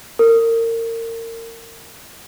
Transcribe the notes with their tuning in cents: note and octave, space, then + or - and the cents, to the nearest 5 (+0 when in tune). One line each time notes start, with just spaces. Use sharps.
A#4 -30